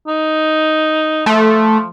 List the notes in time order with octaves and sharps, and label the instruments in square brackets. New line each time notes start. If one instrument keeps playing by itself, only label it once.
[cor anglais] D#4
[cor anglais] F3 [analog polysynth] A3